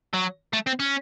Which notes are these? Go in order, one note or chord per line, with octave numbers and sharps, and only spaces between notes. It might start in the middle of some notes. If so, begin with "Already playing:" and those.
F#3
A3
C4
C#4